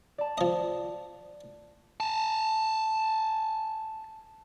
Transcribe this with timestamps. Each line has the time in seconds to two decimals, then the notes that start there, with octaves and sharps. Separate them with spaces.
0.18 D5 A5
0.38 F3 D#5
2.00 G#5 A5